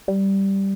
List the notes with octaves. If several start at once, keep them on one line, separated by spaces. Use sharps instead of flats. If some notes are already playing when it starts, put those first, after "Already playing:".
G3